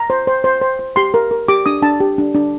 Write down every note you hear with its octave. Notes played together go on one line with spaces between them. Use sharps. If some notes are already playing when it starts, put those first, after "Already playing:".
Already playing: A#5
C5
C5
C5
C5
C5
G4 C6
A#4
A#4
G4 D6
D4 D#6
D4 A5
G4
D4
D4